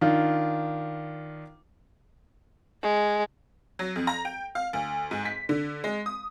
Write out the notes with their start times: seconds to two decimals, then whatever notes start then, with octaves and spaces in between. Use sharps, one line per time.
0.01 D#3 D4 F4
2.83 G#3
3.79 F#3
3.96 F2
4.07 A#5
4.25 G5
4.55 F5
4.73 D2
5.11 G#2
5.25 B6
5.49 D3
5.84 G#3
6.06 D#6